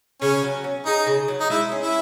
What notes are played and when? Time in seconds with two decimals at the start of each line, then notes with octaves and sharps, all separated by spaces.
0.22 C#3 C#4
0.43 F#3
0.64 C#4
0.86 D#4 G#4
1.07 C#3
1.28 F#3
1.40 D#4
1.50 G#3 E4
1.72 C#4
1.82 E4